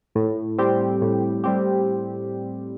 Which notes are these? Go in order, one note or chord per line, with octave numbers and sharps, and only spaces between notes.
A2
G3 C4 G4
A2
G3 C4 G4